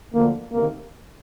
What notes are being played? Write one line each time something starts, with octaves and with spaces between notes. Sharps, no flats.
D2 D3 F3 A#3
D2 C3 D#3 A#3